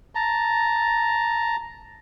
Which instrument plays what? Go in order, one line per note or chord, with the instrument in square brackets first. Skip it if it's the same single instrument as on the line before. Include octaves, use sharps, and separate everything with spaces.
[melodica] A5 A#5